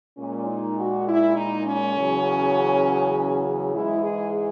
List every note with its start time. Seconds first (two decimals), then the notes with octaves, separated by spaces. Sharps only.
0.17 A#2 G#3 C#4
0.47 D#4
0.77 F#4
1.07 E4
1.35 D#4
1.65 C#4
1.95 E2 C#3 F#3
3.74 G#2 E3 G#3 E4
4.03 G#4